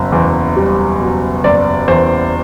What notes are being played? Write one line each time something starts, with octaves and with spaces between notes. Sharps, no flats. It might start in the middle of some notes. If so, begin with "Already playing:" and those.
Already playing: F#1 B2
E2
G3
B2
F#1 D5
E2 C5